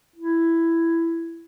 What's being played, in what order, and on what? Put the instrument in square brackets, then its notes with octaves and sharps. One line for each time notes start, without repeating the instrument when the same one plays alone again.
[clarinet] E4